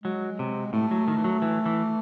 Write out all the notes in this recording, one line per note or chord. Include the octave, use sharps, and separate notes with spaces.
F#3 G#3
C3
A2 A3
F#3
D#3
E3
F#3
E3
E3